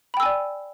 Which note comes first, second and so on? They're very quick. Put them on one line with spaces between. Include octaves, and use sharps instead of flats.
B5 G5 E6 G#5 D5